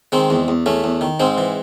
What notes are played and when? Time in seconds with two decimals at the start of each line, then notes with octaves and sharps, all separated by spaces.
0.12 D#3 G#3 C4
0.30 E2
0.48 E2
0.66 E2 A3 C#4
0.84 E2
1.01 D#3
1.20 G#2 G#3 C4
1.38 E3